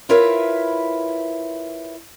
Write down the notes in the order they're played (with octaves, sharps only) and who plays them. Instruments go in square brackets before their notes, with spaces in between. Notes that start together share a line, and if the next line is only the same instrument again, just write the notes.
[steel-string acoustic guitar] E4 F4 A#4 B4 C#5 E5